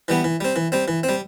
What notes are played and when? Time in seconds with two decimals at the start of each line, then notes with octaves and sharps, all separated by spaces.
0.08 E3 G3 B3
0.24 E3
0.41 G3 C4
0.56 E3
0.72 G3 C4
0.88 E3
1.03 C4
1.09 G3